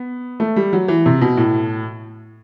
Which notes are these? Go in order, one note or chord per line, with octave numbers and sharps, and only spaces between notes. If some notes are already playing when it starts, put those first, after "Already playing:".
Already playing: B3
A3
G3
F#3
E3
C3
B2
A2